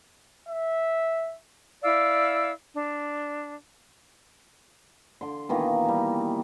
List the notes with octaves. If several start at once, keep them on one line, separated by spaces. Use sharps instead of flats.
E5
E4 D5 F5 E6
D4
D3 C6
B2 D#3 E3 A#3
G3 G#5